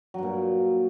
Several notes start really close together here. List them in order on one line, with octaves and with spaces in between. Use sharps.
F#3 G2 A#2